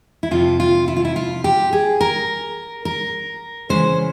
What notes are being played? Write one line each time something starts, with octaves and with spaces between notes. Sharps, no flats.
E4
F2 C3 F3 F4
F4
E4
F4
E4
F4
G4
G#4
A#4
A#4
C#3 E3 G#3 C#4 C5